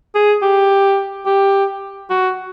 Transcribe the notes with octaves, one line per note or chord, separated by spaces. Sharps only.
G#4
G4
G4
F#4